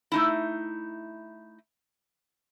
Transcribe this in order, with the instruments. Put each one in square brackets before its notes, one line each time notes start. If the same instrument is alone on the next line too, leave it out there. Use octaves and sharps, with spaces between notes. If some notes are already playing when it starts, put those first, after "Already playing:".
[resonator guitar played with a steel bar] A3 D#4 E4